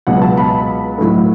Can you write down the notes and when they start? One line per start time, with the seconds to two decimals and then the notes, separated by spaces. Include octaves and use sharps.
0.07 C#2 B2 F#3 B3 F#5
0.22 A5
0.38 B5
0.99 A2 F#3 A3